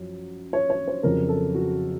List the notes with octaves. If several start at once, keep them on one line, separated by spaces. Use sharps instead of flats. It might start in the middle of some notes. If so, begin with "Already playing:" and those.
Already playing: F#2 F3
C#5
C#5
C5
F2 C#3 F#3 A#4
A4
F#4